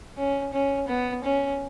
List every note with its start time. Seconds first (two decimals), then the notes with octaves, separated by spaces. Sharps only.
0.18 C#4
0.54 C#4
0.89 B3
1.24 C#4